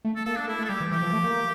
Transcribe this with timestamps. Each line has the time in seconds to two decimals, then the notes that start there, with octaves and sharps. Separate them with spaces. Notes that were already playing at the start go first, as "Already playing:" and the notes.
0.05 A3
0.16 A4
0.26 A#3 A4
0.36 D4
0.48 A3 E4
0.59 A3
0.64 A4
0.69 G3 G4
0.80 E3
0.91 E3 G4
1.02 F3
1.13 A3
1.24 A#3